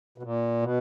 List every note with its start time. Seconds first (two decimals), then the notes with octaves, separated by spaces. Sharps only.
0.18 B2
0.23 A#2
0.62 B2